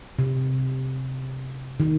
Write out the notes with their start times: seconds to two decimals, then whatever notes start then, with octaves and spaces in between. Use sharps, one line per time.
0.19 C3
1.80 D#3